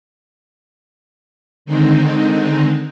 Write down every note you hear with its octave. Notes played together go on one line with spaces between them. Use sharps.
D3 D#3 G#3 C4 D#4